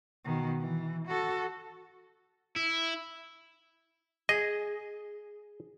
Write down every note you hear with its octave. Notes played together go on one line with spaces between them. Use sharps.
B2 D#3
E3
F#4 A4
E4
G#4 D#5